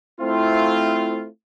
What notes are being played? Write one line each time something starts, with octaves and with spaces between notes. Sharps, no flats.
A3 C4 E4 F4